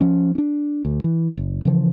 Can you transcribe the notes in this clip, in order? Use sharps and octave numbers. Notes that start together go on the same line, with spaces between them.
F3 C#4
C#4 D4
D2
E3
F#1
C#3 E3 F3